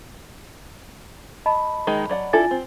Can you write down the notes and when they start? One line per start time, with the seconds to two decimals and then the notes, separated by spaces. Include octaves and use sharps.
1.46 D#5 A5 B5
1.87 D#3 G#3 D#4
2.09 F#3 D5 F#5
2.33 D4 E4 F4 A4 G#5 A6
2.51 C4